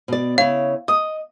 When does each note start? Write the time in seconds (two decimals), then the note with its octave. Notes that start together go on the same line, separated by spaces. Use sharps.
0.08 B2 D5
0.38 C#3 E4 C#5 F5
0.88 D#5 D#6